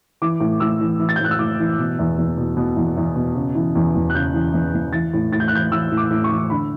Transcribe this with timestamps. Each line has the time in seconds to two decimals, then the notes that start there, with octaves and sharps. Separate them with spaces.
0.22 E3 D6
0.40 A2
0.60 A2 E6
0.80 E3
0.99 E3
1.09 A6
1.16 G6
1.20 A2 F#6
1.31 E6
1.39 A2 D6
1.60 E3
1.78 B2
1.99 E2
2.18 E2
2.37 B2
2.57 B2
2.76 E2
2.97 E2
3.16 B2
3.35 C#3
3.55 E3
3.75 E2
3.95 E2
4.10 F#6
4.15 C#3 G6
4.34 E3
4.53 E2
4.74 E2
4.93 E3 A6
5.13 A2
5.32 A2 A6
5.40 G6
5.48 F#6
5.53 E3 G6
5.71 E3 E6
5.91 A2
5.97 D6
6.11 A2
6.24 C#6
6.31 E3
6.50 D3 B5